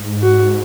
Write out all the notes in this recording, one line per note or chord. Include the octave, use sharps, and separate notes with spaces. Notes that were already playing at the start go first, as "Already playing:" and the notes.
Already playing: G#2
F#4